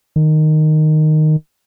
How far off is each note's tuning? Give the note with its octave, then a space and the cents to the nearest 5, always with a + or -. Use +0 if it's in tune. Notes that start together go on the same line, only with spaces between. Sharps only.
D#3 -10